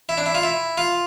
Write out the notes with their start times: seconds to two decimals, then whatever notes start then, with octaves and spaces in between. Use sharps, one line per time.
0.09 E4
0.18 D4
0.26 E4
0.35 F4
0.43 E4
0.78 F4